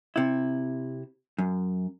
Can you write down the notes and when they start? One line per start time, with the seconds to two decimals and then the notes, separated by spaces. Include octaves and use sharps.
0.16 C3 E4
1.38 F#2